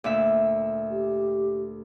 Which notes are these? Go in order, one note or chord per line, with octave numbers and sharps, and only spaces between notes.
D2 A#2 E5
G4